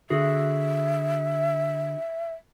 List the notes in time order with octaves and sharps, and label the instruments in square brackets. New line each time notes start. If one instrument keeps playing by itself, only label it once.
[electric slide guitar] D3 F#4 G#4 [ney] E5